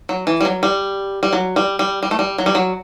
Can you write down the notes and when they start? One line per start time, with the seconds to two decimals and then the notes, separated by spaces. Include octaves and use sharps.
0.09 F#3
0.27 E3
0.41 G3
0.45 F#3
0.63 G3
1.23 G3
1.33 F#3
1.56 G3
1.79 G3
2.03 G3
2.11 A3
2.19 G3
2.38 F#3
2.46 G3
2.55 F#3